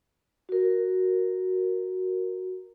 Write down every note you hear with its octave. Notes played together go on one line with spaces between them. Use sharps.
F#4 A#4